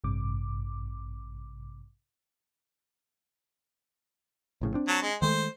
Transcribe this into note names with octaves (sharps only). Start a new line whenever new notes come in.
A1 G2 C3 D6
A#1 A2 C#3
C4 D4
F#3 A5
G#3
D#3 G#3 A3 C5